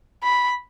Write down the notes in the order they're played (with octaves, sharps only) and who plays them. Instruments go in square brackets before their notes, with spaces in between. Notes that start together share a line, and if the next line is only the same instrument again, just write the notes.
[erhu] B5